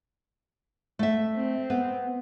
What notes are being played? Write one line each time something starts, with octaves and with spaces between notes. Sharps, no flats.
A3 E5
C4
B3